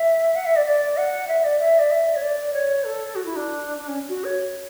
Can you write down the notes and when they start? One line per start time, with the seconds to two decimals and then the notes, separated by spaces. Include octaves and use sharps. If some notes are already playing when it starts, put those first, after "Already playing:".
Already playing: E5
0.35 F#5
0.46 E5
0.56 D5
0.66 D5
0.97 F#5
1.28 E5
1.44 D5
1.60 E5
1.79 D5
1.91 E5
2.15 C#5
2.22 D5
2.53 C#5
2.84 A4
3.15 F#4
3.25 E4
3.36 D4
3.78 D4
3.88 C#4
4.09 F#4
4.24 C#5